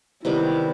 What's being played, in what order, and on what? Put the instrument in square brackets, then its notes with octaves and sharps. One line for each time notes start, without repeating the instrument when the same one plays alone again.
[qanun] C3 D#3 G3 B3 [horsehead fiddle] E4